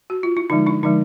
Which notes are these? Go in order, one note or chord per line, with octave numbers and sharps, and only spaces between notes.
F#4
F4
E4
D3 F3 G#3 D#4
D4 E4
D3 F3 G#3 D#4